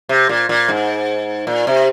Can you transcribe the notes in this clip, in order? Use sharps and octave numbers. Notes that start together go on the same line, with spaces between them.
C3
A#2
A#2
G#2
A#2
C3